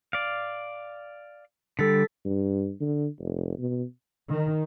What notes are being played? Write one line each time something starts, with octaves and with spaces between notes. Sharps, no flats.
D5 F5
D3 G3 A4 A6 B6
G2
D3
F1
B2
D#3